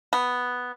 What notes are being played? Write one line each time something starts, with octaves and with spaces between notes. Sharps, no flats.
B3